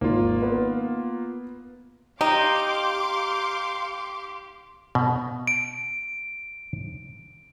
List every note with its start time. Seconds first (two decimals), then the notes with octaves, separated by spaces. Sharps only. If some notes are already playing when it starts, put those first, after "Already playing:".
0.01 G#1 A#3 F4
0.42 B3 B4
2.21 D#4 G4 F5 C6 D6
4.95 B2
5.47 D7